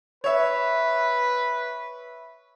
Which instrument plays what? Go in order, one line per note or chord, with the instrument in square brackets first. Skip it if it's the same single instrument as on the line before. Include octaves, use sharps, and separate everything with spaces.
[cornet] B4 [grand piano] C#5 E5